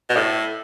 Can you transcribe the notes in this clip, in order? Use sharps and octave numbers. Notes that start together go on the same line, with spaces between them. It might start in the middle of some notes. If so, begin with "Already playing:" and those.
B2
A2